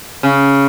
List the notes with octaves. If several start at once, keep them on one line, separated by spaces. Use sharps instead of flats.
C#3